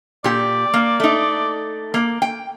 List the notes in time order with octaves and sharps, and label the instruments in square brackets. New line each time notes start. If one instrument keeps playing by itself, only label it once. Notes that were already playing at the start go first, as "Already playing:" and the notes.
[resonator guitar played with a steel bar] A#2 G4 [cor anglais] D5
[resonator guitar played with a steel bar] A#3
A3 D#4
A#3
G5